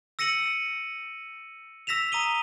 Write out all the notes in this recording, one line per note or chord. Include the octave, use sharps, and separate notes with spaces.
E6 A#6 C#7 D#7 F#7
E6 A#6 B6 E7 F7
A#5 D#6 D#7 G7